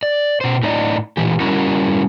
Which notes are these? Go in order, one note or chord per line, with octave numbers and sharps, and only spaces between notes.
D5
B2 C5
A2 D#4 D5 D#5
A#2 E3 G4
G3 C#4 E4 F#4 A#4